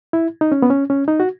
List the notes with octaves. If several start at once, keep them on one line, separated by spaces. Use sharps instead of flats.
E4
D#4
C#4
B3
C#4
C#4
D#4
F#4